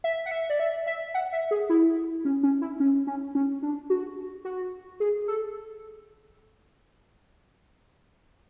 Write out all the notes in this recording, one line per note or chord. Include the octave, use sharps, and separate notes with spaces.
E5
F#5
E5
D5
E5
E5
F#5
E5
G#4
E4
C#4
C#4
E4
C#4
C#4
C#4
D4
F#4
F#4
G#4
A4